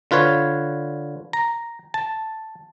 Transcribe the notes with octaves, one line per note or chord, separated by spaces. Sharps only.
D3 F4 B4 C#5
A#5
A5